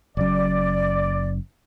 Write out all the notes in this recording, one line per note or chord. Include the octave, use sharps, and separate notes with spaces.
F#1 F#2 D5